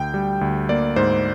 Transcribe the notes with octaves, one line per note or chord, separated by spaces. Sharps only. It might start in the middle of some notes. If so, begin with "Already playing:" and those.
Already playing: D2 G5
G3
D2
A#3 D5
G#2 C5